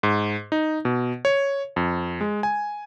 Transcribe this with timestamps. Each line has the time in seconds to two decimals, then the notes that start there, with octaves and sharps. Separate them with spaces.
0.03 G#2
0.52 D#4
0.85 B2
1.25 C#5
1.76 F2
2.21 G#3
2.43 G#5